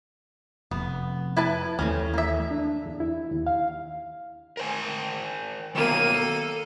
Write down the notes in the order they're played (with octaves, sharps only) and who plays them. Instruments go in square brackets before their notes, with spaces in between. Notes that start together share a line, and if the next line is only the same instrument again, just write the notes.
[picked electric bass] F1 [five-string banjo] B3
[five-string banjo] E4 B4 A5
[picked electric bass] D#2 E3 A3 [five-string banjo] C4 C#4
[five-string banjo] A#3 E5
[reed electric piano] D4
E2
E4
D#2
F5
[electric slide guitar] A#4 C5 G#5
[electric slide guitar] D#3 F#3 B3 [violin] A#3 D#7
[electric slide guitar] A4